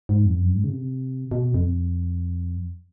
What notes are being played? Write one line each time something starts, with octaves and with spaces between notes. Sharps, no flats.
G#2
F2
F#2
G#2
C#3
C3
B2
F2